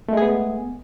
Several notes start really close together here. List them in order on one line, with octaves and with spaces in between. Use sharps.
A3 G#3 G#4 B3